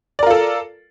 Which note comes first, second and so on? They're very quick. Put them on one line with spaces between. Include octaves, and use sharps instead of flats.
D5 A#4 F4 A4